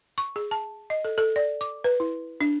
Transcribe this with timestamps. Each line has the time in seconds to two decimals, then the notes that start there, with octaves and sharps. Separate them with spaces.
0.18 C#6
0.36 G#4
0.51 A5
0.90 D#5
1.05 A4
1.18 A4
1.36 D5
1.61 D6
1.84 B4
2.00 E4
2.41 D4